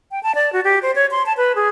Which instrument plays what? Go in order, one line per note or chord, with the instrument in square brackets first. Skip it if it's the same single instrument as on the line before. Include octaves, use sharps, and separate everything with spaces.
[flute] G5
A5
D5
F#4
G4
C5
C#5
C6
A5
B4
G#4